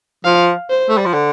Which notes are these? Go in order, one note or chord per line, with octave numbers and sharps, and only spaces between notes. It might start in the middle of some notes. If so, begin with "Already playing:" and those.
F3 F5
C5
A3
G3
F3
D3